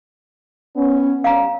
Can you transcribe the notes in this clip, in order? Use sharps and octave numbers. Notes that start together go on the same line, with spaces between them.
B3 C#4
G3 C#4 F5 A#5